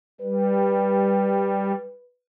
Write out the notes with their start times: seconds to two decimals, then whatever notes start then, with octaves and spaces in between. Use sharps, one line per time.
0.21 G3 B4